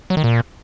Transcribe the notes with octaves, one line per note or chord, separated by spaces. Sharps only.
F#3
D#3
A#2